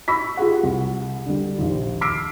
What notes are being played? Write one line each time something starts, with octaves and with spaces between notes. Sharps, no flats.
B5 C#6 E6 B6
F4 G4 G#4 F#5
C2
D3 G3
A#1 D#2
D6 E6 F6 B6 C7 D7